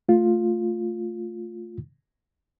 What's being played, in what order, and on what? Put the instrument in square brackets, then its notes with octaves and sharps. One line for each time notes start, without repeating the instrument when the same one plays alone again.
[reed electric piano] A3 F4